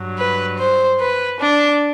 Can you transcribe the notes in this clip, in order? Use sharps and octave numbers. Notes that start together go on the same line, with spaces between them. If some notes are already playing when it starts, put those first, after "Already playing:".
Already playing: G2 F#3
B4
C5
B4
D4